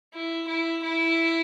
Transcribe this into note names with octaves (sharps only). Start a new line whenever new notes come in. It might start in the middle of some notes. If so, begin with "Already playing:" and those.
E4
E4
E4